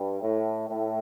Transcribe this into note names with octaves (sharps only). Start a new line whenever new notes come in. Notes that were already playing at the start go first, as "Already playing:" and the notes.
Already playing: G2
A2
A2